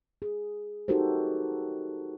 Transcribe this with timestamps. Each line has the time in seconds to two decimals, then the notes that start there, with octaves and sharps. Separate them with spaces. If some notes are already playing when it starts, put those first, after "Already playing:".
0.22 G#4
0.88 D#4 F#4 G4 A4 A#4 C5